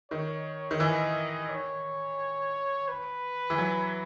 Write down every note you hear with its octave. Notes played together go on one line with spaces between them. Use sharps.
D#3 C#5
D#3
E3 D#5
C#5
B4
E3
F#3